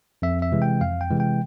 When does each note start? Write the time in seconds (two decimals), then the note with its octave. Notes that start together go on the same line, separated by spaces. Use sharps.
0.22 F2 E5
0.42 E5
0.52 C3 E3 G#3
0.62 G5
0.81 F2 F5
1.01 G5
1.11 C3 E3 G#3
1.20 G5